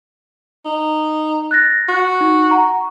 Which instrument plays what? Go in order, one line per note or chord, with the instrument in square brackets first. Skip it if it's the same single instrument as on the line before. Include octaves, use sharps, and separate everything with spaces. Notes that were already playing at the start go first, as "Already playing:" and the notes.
[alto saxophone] D#4
[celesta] F#6 A6 A#6
[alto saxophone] F#4
[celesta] D#4
F#5 A#5 C#6